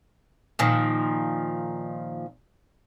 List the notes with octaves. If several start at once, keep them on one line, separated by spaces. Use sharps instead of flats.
A#2 D#3 F3